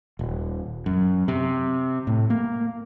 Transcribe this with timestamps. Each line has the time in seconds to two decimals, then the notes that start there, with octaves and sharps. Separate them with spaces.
0.19 D#1
0.86 F#2
1.28 C3
2.07 A2
2.30 A#3